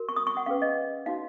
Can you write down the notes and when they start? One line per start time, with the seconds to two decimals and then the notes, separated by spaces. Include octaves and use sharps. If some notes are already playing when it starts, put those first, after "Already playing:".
Already playing: F#4 A#4
0.09 C#6
0.16 D#6
0.27 C#6
0.37 F#5
0.46 C#4 G#4 B4 F5
0.62 D#5
1.06 D#4 F#4 C#5 F5